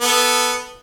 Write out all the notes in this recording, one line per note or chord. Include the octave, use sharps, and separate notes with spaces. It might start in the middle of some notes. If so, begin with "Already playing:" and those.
B3 A4